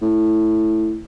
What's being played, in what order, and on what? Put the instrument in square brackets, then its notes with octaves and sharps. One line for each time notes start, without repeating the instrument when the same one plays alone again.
[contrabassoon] A2